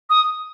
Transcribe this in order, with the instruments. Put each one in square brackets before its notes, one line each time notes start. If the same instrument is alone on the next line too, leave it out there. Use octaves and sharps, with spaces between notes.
[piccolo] D#6